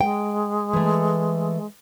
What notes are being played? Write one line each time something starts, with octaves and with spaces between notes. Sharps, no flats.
G#3 G5
E3 A3